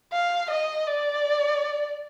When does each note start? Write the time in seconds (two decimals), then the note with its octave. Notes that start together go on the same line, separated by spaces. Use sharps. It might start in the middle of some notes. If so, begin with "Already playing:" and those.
0.13 F5
0.50 D#5
0.87 D5